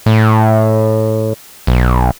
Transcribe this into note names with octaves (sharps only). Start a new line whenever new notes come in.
A2
B1